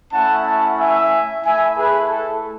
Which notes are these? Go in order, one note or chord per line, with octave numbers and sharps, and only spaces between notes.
A3 C#4 E4 F#5 A5
F#5 A5
E5 G#5
A3 E4 E5 G#5
G#4 B4
A4